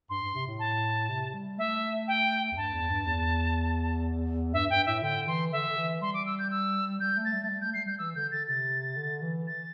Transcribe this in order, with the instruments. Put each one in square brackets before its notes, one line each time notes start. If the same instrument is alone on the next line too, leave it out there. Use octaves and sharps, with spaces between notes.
[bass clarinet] G2 [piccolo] C6
[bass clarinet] G2
C3
A2
[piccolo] A5
[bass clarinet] C3
G3
[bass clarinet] A3 [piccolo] E5
[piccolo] G5
[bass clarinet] E2
[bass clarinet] G2 [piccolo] A5
[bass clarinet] E2
G2
E2
[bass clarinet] G2 [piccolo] E5
[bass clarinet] G2 [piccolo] G5
[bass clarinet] A2 [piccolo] E5
[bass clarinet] D3 [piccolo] G5
[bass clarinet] E3 [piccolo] C6
[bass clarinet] D3 [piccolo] E5
[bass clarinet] D3
E3
[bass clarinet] G3 [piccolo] C6
[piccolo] D6
E6
G6
E6
[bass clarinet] G3 [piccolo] G6
[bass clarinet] A3
[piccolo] A6
[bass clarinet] G3
A3
G3
[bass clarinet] A3 [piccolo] G6
[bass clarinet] G3 [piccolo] C7
[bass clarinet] G3 [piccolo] G6
[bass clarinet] E3 [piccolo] E6
[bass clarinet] D3 [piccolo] G6
[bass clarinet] D3 [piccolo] A6
[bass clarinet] C3 [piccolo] A6
[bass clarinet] D3
E3
[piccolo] A6